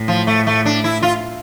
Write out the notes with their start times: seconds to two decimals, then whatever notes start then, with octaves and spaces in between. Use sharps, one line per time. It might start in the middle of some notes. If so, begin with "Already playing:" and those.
Already playing: A2
0.08 F3
0.27 A3
0.47 A3
0.65 D4
0.84 E4
1.02 F4